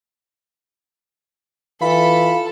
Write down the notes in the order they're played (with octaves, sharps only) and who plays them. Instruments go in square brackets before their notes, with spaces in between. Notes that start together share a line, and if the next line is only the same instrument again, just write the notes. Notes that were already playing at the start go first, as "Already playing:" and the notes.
[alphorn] E3 [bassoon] F4 [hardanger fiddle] A4 [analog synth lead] B5